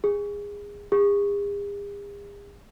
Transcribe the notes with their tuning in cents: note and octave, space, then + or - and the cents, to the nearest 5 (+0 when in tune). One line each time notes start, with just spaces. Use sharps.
G#4 -20
G#4 -45